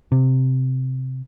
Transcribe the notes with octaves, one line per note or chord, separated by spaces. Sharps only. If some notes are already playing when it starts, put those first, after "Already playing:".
C3